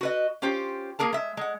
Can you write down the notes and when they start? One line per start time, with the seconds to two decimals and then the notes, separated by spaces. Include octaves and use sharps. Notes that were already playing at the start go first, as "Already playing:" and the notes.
0.01 F#4 B4 D#5
0.42 C#4 F4 G4 C5
0.99 A#3 G#4 A#4 A5
1.13 G#3 E5
1.37 G#3 F#5